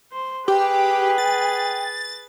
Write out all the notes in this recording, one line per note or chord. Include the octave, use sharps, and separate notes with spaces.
C5
G4 G#4 B4 G5
A6